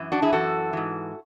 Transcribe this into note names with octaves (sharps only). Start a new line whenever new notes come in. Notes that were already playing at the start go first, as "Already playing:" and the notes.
Already playing: F#2 E3
D4 F#4
E4 G#4
F#2 E3 F#4 A4
G#2 E3